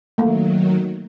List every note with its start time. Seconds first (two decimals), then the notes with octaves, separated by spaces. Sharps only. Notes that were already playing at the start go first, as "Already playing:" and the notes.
0.18 D#3 F#3 A3 A#3